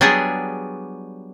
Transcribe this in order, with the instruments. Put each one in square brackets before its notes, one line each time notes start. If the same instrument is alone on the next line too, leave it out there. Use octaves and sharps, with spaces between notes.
[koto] F#3 G3 B3 D4 G#4